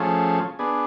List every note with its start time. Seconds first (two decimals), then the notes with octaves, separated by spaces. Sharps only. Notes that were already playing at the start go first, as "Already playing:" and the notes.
Already playing: F3 A3 C#4 G#4
0.59 B3 D4 G#4